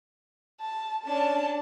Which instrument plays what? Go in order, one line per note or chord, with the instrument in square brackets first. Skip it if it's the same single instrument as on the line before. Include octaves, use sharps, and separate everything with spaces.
[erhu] A5
[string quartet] C#4 D4 D5 [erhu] A5